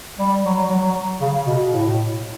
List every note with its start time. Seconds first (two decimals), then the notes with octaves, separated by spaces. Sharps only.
0.19 G3
0.45 F#3
0.70 F#3
1.21 C#3
1.47 B2
1.72 A2